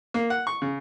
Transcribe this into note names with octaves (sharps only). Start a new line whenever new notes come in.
A#3
F#5
C#6
C#3